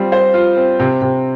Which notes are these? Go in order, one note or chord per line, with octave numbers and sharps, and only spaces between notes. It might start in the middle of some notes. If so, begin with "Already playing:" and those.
Already playing: G3 C4 F4
C5
F4
C4
C3
C3